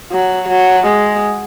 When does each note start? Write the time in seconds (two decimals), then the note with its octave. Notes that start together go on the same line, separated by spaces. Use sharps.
0.12 F#3
0.49 F#3
0.86 G#3